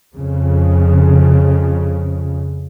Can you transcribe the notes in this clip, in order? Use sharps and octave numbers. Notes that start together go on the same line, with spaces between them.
F2 C#3